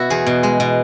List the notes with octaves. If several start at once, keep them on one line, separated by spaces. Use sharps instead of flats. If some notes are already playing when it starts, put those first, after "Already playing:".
Already playing: B2 E4 F#4
E2 G#4
B2
G#3
B2